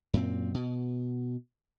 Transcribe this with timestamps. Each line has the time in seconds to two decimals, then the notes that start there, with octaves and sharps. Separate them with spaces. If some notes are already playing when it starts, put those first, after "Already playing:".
0.13 F#2 A#2 C4
0.54 B2